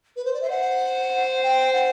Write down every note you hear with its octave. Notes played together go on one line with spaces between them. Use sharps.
B4
C5
D5
E5
C5 F#5
G5
F#5